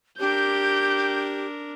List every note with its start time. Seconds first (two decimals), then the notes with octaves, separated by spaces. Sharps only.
0.20 D4 G4 A#4 G6